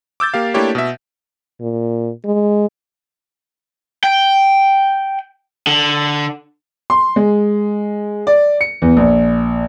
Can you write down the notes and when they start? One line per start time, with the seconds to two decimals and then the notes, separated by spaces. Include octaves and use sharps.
0.20 D6 E6 G6 A6
0.34 A#3 G4 F5
0.54 A3 A#3 D4 E4 G4 C#5
0.75 B2 E5
1.61 A#2
2.25 G#3
4.04 G5
5.67 D3
6.90 C6
7.16 G#3
8.27 D5
8.61 C#7
8.82 E2
8.97 A#1